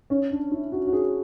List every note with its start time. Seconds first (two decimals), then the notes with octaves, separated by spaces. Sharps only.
0.10 C#4
0.31 D4
0.52 E4
0.72 F#4
0.87 F#4
0.93 G#4